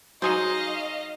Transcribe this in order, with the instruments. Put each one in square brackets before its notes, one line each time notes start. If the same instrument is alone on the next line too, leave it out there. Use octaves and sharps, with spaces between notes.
[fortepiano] F#3 [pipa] D#4 G#4 C5 [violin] D#5 F5